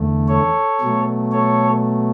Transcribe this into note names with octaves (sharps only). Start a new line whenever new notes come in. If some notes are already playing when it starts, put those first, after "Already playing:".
Already playing: E2 D3 A3
A4 C#5
B2 F#3 A3
A4 C#5